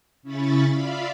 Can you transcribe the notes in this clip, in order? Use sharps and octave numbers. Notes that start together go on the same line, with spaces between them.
C#3 C#4 E4 C#5 B5 A6
F4 D5 E5 F5 B5